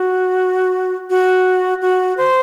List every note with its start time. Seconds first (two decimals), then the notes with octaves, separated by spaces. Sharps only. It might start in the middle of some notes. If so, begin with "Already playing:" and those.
Already playing: F#4
1.10 F#4
1.81 F#4
2.17 C5